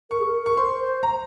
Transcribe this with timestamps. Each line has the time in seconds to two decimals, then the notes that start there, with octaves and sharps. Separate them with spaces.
0.10 A#4 C#6
0.20 G#4
0.26 A#4
0.42 A#4 C#6
0.57 C5 C6
0.80 C5
1.03 A#5